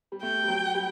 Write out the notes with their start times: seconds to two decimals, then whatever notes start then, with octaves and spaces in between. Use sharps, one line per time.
0.12 G3
0.22 A3 G5
0.44 G3
0.48 F#3
0.75 G3